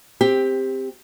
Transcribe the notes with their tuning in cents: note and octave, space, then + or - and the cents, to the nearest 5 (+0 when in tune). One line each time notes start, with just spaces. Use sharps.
C4 +0 G4 +15